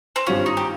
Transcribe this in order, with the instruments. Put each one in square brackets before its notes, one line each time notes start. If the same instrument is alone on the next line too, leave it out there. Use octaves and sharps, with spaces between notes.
[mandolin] C4
[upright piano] G#1 G2 G3 C4 F4 [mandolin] C#4
[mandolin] D#4
G4